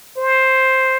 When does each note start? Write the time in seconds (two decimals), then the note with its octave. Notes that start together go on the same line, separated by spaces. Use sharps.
0.17 C5